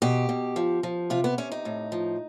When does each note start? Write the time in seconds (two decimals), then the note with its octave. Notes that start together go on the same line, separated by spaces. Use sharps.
0.02 B2 G4
0.29 B2
0.56 F3
0.83 F3
1.10 C3 F4
1.24 B3
1.38 C3 C#4
1.52 D#4
1.65 A2
1.92 F3